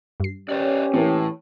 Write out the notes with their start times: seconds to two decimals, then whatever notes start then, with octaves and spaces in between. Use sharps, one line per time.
0.20 G2 C7
0.49 C#4 G4 B4 C#5 D5
0.94 A2 E3 A#3 C4